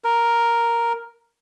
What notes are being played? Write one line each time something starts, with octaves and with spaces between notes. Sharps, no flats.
A#4